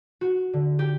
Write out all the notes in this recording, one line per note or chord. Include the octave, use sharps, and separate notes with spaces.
F#4
D3
G4